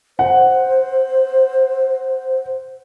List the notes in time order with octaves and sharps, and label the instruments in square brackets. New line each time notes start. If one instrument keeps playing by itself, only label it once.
[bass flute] C5 [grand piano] F#5